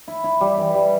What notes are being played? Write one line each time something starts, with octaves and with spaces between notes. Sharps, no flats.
E4
E4
G3
E3
G3